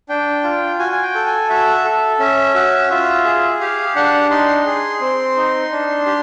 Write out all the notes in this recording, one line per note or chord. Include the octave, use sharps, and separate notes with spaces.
D4 G5
F4
F#4 G#5
G#5
G5
A4
G#5
F#4 E5
A4
C#4 E5
F#4 E5
F4 E5
G#4
G4 F5
D4 F#5
D#4 C6
G#4
C4
D#4
D4
G4